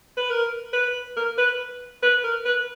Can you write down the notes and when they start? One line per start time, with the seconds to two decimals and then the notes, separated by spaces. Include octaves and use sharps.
0.17 B4
0.30 A#4
0.73 B4
1.17 A#4
1.38 B4
2.03 B4
2.24 A#4
2.46 B4